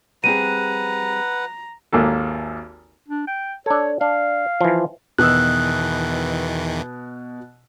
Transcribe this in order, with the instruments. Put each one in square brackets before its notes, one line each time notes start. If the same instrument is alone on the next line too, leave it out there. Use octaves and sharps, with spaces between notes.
[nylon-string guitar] G3 C4 G#4 [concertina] B4 F#5 [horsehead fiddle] A#5 [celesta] D#7
[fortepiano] G#1 D#2 A#3 A4
[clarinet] D4
G5
[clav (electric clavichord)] D4 A4 [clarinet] C#5
[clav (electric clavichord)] D4 [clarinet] F5
[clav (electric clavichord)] E3 F3
[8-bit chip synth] E2 D#3 E3 [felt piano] B2 D#6 E6 [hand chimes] F#6